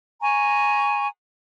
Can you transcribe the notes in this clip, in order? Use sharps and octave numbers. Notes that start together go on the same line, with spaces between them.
G#5 A#5 C#6